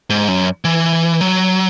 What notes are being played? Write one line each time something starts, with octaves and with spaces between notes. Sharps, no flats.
G#2
F#2
E3
F#3